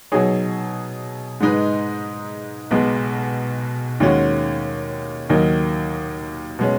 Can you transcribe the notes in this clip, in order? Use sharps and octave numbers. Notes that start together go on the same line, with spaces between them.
B2 F#3 D#4 G#4 C#5
G#2 G#3 D#4 B4
B1 B2 G#3
D#2 D#3 G#3 C#4 F#4
D#2 D#3 F#3 D#4
B2 G#3 C#4